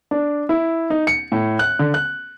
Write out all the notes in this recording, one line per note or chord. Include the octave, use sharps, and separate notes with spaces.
D4
E4
D#4
C#7
A2
F#6
D3
F#6